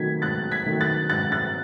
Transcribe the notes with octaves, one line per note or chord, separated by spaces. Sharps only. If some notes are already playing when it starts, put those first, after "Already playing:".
Already playing: D#3 F#3 A3 G#6 B6
G#2 F#6 A6
G#6 B6
D#3 F#3 A3
F#6 A6
G#2 F#6 A6
F#6 A6